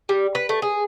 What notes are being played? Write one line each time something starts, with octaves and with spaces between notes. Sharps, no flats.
G3
B4
A3
G#4